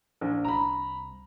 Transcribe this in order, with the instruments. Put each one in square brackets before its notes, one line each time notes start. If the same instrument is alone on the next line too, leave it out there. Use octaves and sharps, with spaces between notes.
[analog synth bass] D#1 [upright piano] A#1
[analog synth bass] C2 [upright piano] A#5 B5